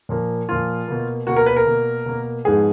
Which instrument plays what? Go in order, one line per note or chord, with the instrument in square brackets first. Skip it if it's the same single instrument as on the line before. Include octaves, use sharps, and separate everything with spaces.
[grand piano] A#2 F3 A#3
A#2 F3 A#3 F4
B2 A#3
B2 A#3 F#4
A#4
B4
A#4
B2 A#3
B2 A#3
G#2 F3 G#3 B3 G#4